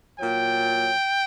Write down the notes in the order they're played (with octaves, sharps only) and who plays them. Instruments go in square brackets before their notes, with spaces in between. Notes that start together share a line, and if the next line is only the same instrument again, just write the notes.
[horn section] A#2 F#3 G5